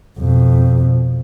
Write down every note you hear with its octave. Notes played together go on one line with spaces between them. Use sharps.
F2 B2